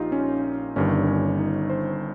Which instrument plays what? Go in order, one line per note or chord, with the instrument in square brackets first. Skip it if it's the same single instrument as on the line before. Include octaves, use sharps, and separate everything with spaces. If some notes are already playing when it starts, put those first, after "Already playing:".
Already playing: [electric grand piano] A#1 A#2 D#4 F4 G4
C#4
G1 G2 D#3 C#4
C#4
D#4
C5